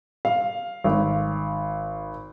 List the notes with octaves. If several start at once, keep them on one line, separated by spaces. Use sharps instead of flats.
F5
G#1